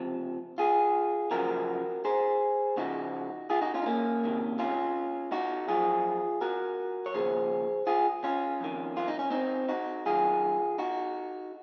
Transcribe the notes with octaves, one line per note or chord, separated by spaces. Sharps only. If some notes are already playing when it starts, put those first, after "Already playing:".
Already playing: C#2 C3 F3
F4 G#4
F#2 C#3 F3 F#4 A#4
G#4 C5
C#2 C#3 F3 D#4 F#4
F4 G#4
D#4 F#4
C#4 F4
D#4
A#3 C#4
C#2 C3 D#3
C#4 F4
D#4 F#4
F#2 F3 F4 G#4
F#4 A#4
C#5
D#2 C#3 F3 G#4 C5
F4 G#4
C#4 F4
F2 D#3
F4
D#4
C#4
C4 D#4
D#4 F#4
F#2 D#3 F4 G#4
D#4 F#4